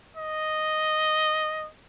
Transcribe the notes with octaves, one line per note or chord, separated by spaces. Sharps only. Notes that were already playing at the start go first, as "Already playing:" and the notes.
D#5